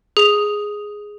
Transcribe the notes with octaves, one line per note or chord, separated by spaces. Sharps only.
G#4 F7